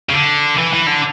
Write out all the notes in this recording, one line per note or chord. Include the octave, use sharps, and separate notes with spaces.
C#3
D3
E3
E3
D3